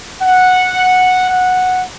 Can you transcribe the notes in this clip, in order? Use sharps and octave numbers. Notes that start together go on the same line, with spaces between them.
F#5
F#5